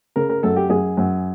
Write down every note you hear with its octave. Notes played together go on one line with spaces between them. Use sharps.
C#3 A#4
A#4
F#2 A4
G4
F#2 G#4
F#2